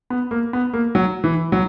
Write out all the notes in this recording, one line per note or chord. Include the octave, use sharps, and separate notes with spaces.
B3
A#3
B3
A#3
F#3
E3
F#3